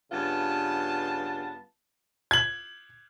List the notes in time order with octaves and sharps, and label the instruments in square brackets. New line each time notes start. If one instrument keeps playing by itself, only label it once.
[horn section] G2 C#3 B3 F4 A5
[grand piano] G#6 F#7